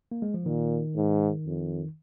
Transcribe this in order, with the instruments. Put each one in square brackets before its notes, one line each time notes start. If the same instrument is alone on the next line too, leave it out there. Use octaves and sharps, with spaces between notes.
[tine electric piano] A#3
G#3
F3
[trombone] A#2 [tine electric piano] D#3
[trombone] G#2
F2